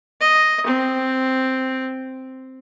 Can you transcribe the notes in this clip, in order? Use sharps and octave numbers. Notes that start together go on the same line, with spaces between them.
D#5
C4